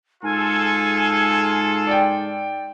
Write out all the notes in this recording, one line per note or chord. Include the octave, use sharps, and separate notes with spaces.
G#2 F4 G#4 A4 G#5
D5 G5